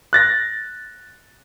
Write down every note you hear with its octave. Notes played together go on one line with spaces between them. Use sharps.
F#6 A6 A#6